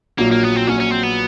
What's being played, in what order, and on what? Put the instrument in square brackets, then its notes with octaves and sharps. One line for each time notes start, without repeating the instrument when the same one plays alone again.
[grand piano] A#1 A#2 F#3 [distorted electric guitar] A#3
[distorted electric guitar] A#3
B3
C4
[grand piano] A#1 A#2 F#3 [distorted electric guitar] C#4
[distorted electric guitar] C#4
C4
B3